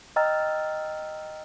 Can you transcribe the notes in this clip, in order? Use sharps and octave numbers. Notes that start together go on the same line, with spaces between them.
D#5 G5 A#5 E6 F6 A6